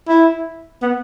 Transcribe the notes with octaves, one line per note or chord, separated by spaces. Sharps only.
E4
B3